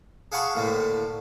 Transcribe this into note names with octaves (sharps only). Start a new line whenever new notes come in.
G#4 F5 F#5 A5 B5 C#6
D2 A2 A#3